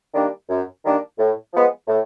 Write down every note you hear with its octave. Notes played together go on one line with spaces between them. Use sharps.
D#3 G3 A#3 D4
F#2
D#3 G3 A#3 D4
A2
F3 G#3 B3
A2